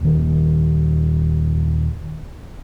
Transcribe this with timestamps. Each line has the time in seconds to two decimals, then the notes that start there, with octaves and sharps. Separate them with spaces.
0.01 D#1 D#3